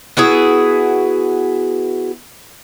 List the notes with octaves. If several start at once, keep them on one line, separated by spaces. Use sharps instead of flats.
B3 E4 F#4 G#4